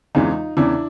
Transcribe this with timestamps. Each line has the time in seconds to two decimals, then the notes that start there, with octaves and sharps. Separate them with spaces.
0.15 E2 C#3 E3 G#3 D#4 F4
0.57 E2 C#3 E3 D4 E4